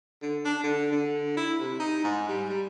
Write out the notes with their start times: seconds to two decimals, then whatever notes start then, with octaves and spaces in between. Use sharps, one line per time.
0.22 D3
0.45 D4
0.64 D3
0.92 D3
1.37 E4
1.60 C3
1.80 D#4
2.04 G#2
2.28 G3
2.50 G3